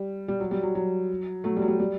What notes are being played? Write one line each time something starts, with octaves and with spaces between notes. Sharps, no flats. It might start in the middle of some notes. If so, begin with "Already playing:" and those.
Already playing: G3
G3
F#3
G3
F#3
F#3
F#3 A3
G3
F#3
G3
G3